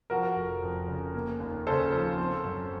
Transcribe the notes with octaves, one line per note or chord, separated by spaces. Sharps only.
F3 F#4 A#4
F1
F2
C#3
A#3
D#2
C#3 A4 C5
F3
C4
F#2